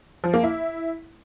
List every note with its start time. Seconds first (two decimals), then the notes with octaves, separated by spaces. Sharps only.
0.24 F3
0.34 A#3
0.43 E4